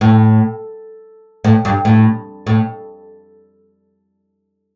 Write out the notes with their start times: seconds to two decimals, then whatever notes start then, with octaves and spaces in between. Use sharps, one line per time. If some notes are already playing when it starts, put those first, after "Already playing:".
0.01 A2
1.44 A2
1.65 G2
1.85 A2
2.47 A2